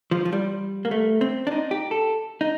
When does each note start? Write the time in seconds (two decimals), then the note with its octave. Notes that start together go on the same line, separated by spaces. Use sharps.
0.11 F3
0.25 F3
0.33 G3
0.85 A#3
0.91 A3
1.21 C4
1.47 D4
1.51 D#4
1.71 G4
1.91 A4
2.41 D#4